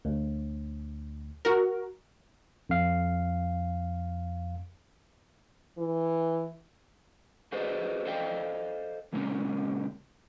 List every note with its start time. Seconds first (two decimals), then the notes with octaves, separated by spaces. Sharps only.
0.05 D2
1.45 F#4 A#4
2.69 F2 F5
5.78 E3
7.52 F#4 G#4 B4 C5 D5 D#5
8.05 A4 C5 D5 D#5 F5 G5
9.13 A#2 C#3 G#3 C4 C#4